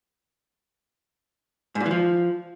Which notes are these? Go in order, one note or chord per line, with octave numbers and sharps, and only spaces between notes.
G#2
A#2
E3
F3